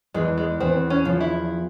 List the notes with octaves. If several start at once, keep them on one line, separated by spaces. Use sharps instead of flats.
E2 G#3
G#3
E2 C4
C#4
F3
E4